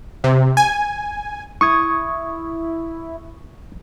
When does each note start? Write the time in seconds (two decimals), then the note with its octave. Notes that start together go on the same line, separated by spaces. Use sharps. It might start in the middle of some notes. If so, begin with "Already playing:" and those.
0.24 C3
0.57 G#5
1.61 E4 C#6 D#6 G#6